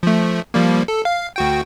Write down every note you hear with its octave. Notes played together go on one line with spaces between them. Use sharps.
F3 A3
F3 G3 A#3
A4
F5
D2 F#4 G5